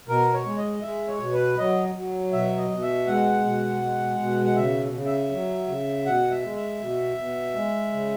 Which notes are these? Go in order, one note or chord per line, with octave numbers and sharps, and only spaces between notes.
B2 A#4
C#5
G#3
D#5
G#3 E5
C#5
B2
B4
F#3 D#5
F#3
B2 E5
D#5
B2
E5
G#3 F#5
B2
G#3
B2
F#5
C#3 E5
C#3
E5
F#3
C#3
B2 F#5
E5
G#3
E5
B2
B2
G#3
C#3